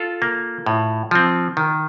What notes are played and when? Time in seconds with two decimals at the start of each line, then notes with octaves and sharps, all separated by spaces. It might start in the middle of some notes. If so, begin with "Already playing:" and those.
Already playing: F4 A4
0.22 A#3
0.66 A2
1.11 F3 C4
1.57 D#3